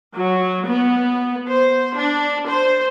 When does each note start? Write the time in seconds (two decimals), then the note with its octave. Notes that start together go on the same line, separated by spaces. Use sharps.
0.17 F#3
0.68 B3
1.48 C5
1.95 D4
2.47 C5